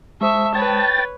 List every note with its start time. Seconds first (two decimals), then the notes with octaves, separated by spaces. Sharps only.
0.21 G#3 C5 E5 A5 C#6 D#6
0.55 B4 C#5 G5 A6